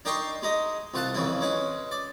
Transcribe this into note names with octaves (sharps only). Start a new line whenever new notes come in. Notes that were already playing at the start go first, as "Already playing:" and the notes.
D4 D#4 A#4 G5 C6 C#6
G#3 D#4 D#5
C2 F4 F#5 A5
F2 C#3 E3 E4
G#3 C#4 B4
D5